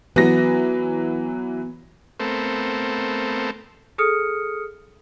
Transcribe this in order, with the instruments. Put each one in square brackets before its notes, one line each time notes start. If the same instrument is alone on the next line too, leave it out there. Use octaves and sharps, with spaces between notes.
[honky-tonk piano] E3 F#3 A#6 [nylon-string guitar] B3
[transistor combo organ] A3 B3 C4 A4 A#4 C5
[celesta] G#4 A4 D#6 F6 C#7